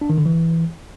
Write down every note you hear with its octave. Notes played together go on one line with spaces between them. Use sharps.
D4
D#3
D3
E3